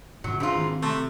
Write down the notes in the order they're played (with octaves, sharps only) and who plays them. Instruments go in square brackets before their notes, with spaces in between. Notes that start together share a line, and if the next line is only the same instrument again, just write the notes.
[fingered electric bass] G#2 D3 [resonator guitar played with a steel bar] F#3
[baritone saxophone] G#2 [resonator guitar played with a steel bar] E3 F4 [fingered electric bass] D4
[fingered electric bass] D#3 C4
[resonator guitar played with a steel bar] C3 [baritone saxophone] A3